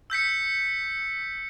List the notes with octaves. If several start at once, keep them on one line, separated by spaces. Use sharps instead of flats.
E6 G6 B6 C#7